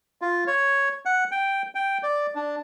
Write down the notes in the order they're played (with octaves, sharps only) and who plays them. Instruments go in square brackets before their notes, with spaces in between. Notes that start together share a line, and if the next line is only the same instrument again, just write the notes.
[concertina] F4
C#5
F#5
G5
G5
D5
D4